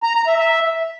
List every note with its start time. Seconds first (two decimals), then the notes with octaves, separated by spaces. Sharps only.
0.03 A#5
0.15 A#5
0.27 E5
0.39 E5